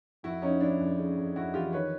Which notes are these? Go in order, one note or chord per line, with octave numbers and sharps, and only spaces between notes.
F2 E4 F#4
F2 C#4 D#4
F2 D4 E4
F2
C#3
F2
F2 E4 F#4
E3 F4 G4
D#3 B4 C#5